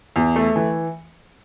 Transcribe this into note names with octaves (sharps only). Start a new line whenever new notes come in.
E2
A3
E3